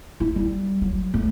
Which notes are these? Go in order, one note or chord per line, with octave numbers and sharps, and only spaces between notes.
E4
G3
F#3
A2